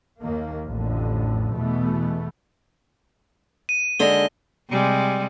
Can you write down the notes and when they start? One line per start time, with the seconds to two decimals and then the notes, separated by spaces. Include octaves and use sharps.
0.21 D#2 D#3 A#3
0.67 A1 F2 A2 D3
1.54 E2 B2 E3 A3 B3
3.69 D#7
3.99 D#2 D3 G#3 A#6 G7
4.69 C3 G3 G#3